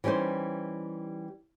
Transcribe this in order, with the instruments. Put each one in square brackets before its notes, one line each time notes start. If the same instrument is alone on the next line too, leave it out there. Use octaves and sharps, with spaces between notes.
[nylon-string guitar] E3 G3 C#4 D#4 C5